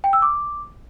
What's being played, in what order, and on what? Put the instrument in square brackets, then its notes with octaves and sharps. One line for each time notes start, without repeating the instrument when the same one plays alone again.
[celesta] G5
E6
D6